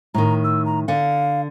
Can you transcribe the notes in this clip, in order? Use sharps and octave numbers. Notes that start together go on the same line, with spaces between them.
A2 D#3 A#5
E6
A#5
D3 F5 F#5